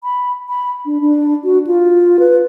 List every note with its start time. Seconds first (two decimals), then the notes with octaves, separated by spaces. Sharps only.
0.04 B5
0.49 B5
0.85 D4
1.01 D4
1.44 F#4
1.67 F4
2.19 B4